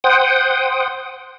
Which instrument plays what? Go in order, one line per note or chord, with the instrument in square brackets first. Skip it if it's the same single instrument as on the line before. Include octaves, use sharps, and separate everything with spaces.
[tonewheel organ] C5 F#5 G5 D#6